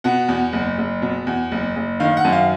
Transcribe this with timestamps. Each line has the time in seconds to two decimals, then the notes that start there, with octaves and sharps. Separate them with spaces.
0.04 B2 F#5
0.28 E2
0.53 F#1
0.78 F#1
1.02 B2
1.27 E2
1.52 F#1
1.76 F#1
2.00 D#3 F5
2.17 F#5
2.25 F#2
2.33 F5